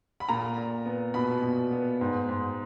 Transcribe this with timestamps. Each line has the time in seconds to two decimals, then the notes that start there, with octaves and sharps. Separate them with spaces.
0.20 B5
0.29 A#2 A#5
0.57 A#2
0.86 B3
1.14 B2 B5
1.43 B2
1.72 B3
2.01 G#2
2.29 G#2